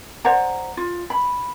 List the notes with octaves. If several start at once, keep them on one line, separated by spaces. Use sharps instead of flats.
C5 D5 F#5 A#5
F4
B5